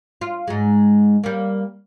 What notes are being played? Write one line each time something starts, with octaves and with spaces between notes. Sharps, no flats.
F4
G#2 G#3
G3 A#3